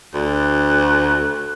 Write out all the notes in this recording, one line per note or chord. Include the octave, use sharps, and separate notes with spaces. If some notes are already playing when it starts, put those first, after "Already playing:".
D2 F#6